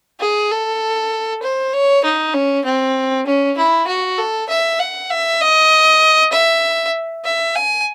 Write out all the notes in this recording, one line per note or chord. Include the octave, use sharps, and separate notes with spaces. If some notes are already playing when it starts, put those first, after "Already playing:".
G#4
A4
C5
C#5
D#4
C#4
C4
C#4
E4
F#4
A4
E5
F#5
E5
D#5
E5
E5
G#5